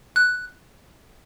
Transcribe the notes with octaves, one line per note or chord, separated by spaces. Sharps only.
F#6